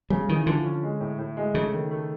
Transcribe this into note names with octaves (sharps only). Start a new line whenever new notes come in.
C#3 G3
D#3 E3
D3 F3
C#4
G#3
A2
A2
G#3
C#3 A3
D#3
A3